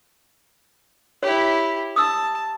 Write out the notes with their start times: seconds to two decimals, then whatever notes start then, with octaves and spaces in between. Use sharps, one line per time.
1.23 E4 G4 C#5
1.96 A5 D#6 E6